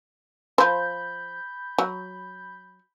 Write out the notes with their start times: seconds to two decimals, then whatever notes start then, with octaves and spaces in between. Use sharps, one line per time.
0.58 F3 C5 B5 G6
1.78 F#3